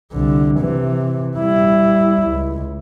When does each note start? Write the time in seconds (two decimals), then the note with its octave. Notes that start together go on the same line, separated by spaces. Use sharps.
0.12 C2 D3
0.60 C3 E3
1.37 G3 E4
2.28 C#2